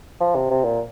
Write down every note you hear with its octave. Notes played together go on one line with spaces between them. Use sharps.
F3
C3
C3
A#2